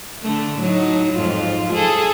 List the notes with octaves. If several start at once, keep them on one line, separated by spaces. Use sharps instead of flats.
D3 A3
A2 F#3 D#4
F2 G#2 F4
G#4 A4